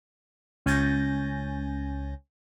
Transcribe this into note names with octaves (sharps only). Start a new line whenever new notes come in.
C#2 C#4 G#5 G6 A6 A#6